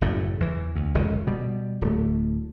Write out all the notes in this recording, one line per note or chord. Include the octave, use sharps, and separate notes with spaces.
F#1 F#2 A2
E2 E3
D2
F1 C#2 G2 D#3
B2 G3
D1 A3